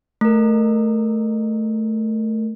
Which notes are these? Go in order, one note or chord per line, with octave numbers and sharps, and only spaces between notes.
A3 A#4